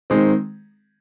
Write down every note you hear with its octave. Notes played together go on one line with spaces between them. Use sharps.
D#3 G#3 C4